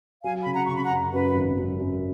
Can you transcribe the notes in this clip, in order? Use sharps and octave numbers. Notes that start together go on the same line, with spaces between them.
F#3 F5 G#5
C#3 B5
F#5 A#5
C#3 C#6
B5
F#5 A#5
F#2
F#2 B4
G#1
F#2
F#2